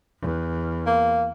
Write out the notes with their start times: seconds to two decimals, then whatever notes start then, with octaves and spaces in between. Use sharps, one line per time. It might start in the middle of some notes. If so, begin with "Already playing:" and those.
0.20 E2
0.86 A#3